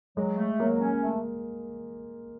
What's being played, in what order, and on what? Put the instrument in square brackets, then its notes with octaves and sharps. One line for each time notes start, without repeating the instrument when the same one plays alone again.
[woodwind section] F#3 [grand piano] G#3
[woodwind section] A3
[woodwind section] F#3 [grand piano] A#3
[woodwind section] C#4
A3